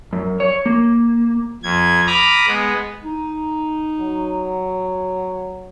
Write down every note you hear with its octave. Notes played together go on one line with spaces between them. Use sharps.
F#2
C#5
A#3
F2 G#6
A#5 B5 D6 D#6 F6
G#3 B3
D#4
F#3